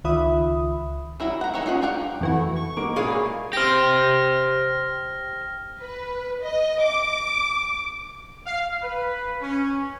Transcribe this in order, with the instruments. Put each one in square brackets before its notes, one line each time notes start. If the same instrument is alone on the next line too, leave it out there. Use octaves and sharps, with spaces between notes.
[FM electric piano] C#2 D#3 F4 E5 B5 D#6
[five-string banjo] F#3 G3 E4 A#4
F#5 A#5
A#3 D#4 A4 C#5 F#5
C#4 F4 G#4 F#5
D4 G4 A#4 F5 F#5
[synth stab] F2 E3 F#4 [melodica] A3
[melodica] C#6
[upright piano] G#3 A#3 F#4 [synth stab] D6
[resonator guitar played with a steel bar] A#2 G#4 F5 [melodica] E4 B4 C#5
[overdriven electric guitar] G4 C5 [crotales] F6 A#6
[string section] B4
D#5
D6
[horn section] F5
B4
C#4